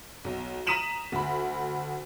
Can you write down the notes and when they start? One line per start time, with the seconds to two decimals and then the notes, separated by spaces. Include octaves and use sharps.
0.24 B1
0.67 A#5 D#6 B6 D#7 E7 F#7
1.12 D2 B5